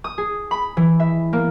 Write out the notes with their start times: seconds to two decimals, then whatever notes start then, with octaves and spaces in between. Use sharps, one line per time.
0.04 D#6
0.18 G#4
0.51 B5
0.77 E3
1.00 E5
1.33 A#3